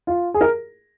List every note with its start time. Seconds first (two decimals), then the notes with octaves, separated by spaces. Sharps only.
0.07 F4
0.34 G#4
0.41 A#4